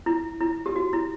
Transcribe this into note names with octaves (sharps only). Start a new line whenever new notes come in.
E4
E4
G4
F#4
E4